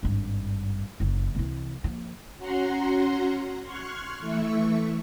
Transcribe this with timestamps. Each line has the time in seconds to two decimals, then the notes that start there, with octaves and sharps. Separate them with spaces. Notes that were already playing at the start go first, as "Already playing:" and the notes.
0.03 G#1 G2
1.00 F#1
1.35 C2 E3
1.84 F3 A#3
2.38 C#4 F#4 F#5 A#5 C6
3.62 C6 C#6 F6 F#6 G#6
4.20 E3 A3 E5 C#6